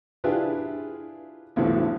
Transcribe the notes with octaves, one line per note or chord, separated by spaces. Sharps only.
D4 E4 F4 G4 G#4 B4
B1 E2 A2 D3 F3